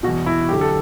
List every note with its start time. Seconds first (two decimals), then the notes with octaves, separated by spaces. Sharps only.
0.03 E2 B2 F#4
0.26 E4
0.49 F#2 D3 G4
0.61 A4